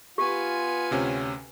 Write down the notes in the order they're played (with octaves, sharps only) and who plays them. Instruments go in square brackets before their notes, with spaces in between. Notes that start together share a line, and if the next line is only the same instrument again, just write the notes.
[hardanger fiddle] B3 G#5 [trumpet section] F4 [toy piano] G4
[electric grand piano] D2 C3 C#4